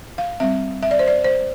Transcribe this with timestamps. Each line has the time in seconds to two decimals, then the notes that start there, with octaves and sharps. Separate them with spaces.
0.18 F5
0.40 G3 C4 E5
0.83 E5
0.91 D5
0.99 C5
1.08 D5
1.24 C5